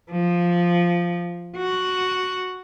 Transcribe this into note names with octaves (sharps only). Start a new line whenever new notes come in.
F3
F#4